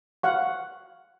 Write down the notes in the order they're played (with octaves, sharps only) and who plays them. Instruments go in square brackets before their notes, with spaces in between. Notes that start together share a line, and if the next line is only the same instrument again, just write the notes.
[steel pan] F5 F#5 C#6